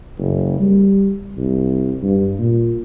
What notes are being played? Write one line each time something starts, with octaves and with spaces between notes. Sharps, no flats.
F#1
G3
C2
G2
A#2